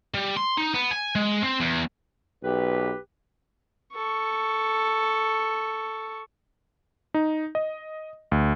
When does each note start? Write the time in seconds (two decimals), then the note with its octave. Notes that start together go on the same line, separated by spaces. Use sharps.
0.14 G3
0.36 C6
0.57 D#4
0.74 B3
0.91 G#5
1.15 G#3
1.42 C4
1.60 E2
2.44 B1 G4 B4
3.94 A4 C#6
7.14 D#4
7.55 D#5
8.32 D2